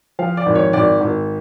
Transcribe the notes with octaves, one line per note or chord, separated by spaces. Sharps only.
F3 F5
D5
G#1
C#5
G#1 D5
G#1